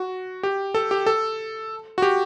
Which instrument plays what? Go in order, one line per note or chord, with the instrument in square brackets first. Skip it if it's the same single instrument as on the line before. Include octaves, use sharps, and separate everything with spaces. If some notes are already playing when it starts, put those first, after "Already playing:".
Already playing: [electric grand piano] F#4
G4
A4
G4
A4
F#4
G4